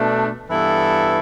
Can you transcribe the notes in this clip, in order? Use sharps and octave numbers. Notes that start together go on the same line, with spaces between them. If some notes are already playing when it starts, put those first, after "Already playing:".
Already playing: B2 A3 D4
G2 E3 B3 E4 A4